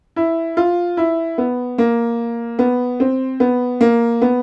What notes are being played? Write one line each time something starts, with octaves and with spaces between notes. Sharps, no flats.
E4
F4
E4
B3
A#3
B3
C4
B3
A#3
B3